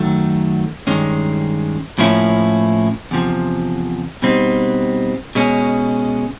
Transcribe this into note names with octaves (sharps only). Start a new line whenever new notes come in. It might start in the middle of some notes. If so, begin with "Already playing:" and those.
Already playing: F#2 D#3 F#3 A3
G2 D#3 G#3 C#4
A2 F3 A#3 C#4 E4
E2 C3 F3
B2 G3 C4 D#4
B2 G#3 C#4